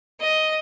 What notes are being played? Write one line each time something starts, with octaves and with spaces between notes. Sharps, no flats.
D#5